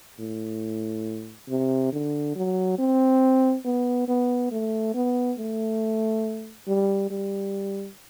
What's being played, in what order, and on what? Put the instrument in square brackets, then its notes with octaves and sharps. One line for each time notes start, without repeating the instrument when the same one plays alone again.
[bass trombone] A2
C3
D3
F#3
C4
B3
B3
A3
B3
A3
G3
G3